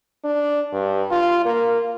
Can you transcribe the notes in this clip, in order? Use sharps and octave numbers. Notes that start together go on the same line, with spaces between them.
D4
G2
F4
A#3